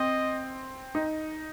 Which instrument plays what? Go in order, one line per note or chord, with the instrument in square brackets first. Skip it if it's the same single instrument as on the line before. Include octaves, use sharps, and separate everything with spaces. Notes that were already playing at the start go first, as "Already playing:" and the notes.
Already playing: [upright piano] C4 [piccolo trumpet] D#5
[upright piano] D#4